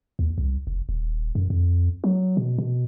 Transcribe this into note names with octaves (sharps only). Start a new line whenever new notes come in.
D#2
C2
F1
D#1
F#2
F2
F#3
B2
B2